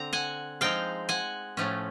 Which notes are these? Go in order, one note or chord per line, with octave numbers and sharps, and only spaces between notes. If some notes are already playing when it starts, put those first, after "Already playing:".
Already playing: D3 C4 A#5
F#5 G#5
F3 G#3 C4 D#4 F5 G5
F#5 G#5
A2 F3 A3 C#4